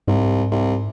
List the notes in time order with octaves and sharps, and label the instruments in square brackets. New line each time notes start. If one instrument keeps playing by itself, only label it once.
[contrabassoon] C2 [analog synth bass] G#2
[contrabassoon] C2